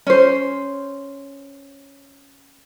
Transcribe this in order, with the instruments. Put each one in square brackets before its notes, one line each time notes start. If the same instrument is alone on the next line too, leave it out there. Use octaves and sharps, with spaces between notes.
[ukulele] C#4 C5